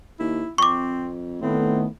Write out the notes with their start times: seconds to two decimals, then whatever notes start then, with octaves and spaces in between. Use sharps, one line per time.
0.20 D#2 E4
0.58 F2 C4 C#6 D6
1.42 A2 D#3 A3 B3 C4